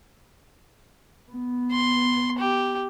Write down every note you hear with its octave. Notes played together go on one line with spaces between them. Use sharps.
B3
C6
G4